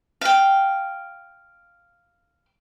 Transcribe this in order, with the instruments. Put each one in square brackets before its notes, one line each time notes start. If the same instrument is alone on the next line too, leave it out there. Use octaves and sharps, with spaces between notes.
[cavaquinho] F5 G5